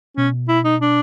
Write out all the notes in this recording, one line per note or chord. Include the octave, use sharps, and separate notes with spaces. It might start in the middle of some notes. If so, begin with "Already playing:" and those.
B2 C#4
E4
D#4
D4